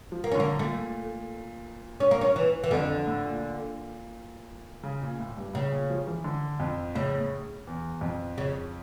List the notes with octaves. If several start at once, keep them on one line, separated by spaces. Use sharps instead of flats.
F3
A#3
C#4
D3 A#3
A#2 A3
C#4
A#3
C#4
E3
E3
F2 D3
A2
A#2
C#3
A#2
A2
G2
A2 C#3
A#2
F3
E3
D3
F2
A2 C#3
A2
E2
F2
C#3